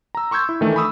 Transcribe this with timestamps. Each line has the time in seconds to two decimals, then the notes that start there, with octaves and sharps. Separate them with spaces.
0.15 A#5 E6
0.31 C6 C#6 E6 G6 G#6
0.49 E4
0.61 D#3 E3 A3 D4
0.75 G#5 B5 C#6 D#6 E6